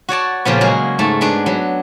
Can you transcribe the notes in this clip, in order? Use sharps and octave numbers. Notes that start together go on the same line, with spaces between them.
F#4 C#5 D5 A5
A#2 C#3 F3 B3
F#3 G#3 A#3 F#4 G#4
G#2 A3 A5
G#3 B3 D4
F#3 B3